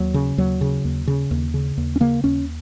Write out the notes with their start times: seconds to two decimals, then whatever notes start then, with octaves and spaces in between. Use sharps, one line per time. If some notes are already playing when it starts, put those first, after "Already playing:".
Already playing: D#2 F#3
0.14 C#3
0.38 D#2 F#3
0.61 C#3
0.85 D#2
1.07 C#3
1.31 D#2
1.54 C#3
1.77 D#2
1.96 C#4
2.00 C#3 A#3
2.24 D#2 C#4